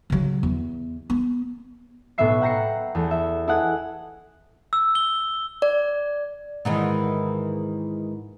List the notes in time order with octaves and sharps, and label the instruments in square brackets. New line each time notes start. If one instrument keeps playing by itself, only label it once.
[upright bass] C#3 F#3
E2
B3
[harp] B1 A2 B3 B4 E5 C7
F#5 G5 A#5 A#6 C7 C#7
E2 A3
E5
E4 G#4 A4 D#5 F#5
[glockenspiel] E6
G7
[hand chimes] D5
[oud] G#2 D#3 E3